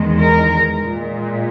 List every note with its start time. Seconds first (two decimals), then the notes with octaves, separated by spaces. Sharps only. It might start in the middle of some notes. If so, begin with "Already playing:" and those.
Already playing: E2 D#3 G#3
0.21 A#4
0.82 A#2 G#3